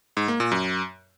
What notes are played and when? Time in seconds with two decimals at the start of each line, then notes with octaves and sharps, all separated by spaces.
0.17 G#2
0.28 A#3
0.40 A#2
0.52 F#2